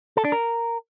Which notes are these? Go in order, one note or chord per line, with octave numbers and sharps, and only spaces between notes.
A4
D4
A#4